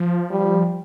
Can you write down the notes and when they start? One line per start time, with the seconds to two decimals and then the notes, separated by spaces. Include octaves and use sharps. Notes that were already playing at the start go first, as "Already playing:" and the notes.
Already playing: F3
0.31 G3